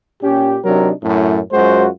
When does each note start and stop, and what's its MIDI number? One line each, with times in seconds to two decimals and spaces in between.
0.22 0.57 46
0.22 0.57 61
0.22 0.57 67
0.65 0.90 48
0.65 0.90 54
0.65 0.90 62
0.65 0.90 63
0.65 0.90 70
1.03 1.39 42
1.03 1.39 45
1.52 1.87 42
1.52 1.87 56
1.52 1.87 65
1.52 1.87 66
1.52 1.87 72